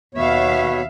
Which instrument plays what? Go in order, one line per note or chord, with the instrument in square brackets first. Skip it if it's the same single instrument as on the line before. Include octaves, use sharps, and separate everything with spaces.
[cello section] D#2 E5 F5 [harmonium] B2 B3 C#5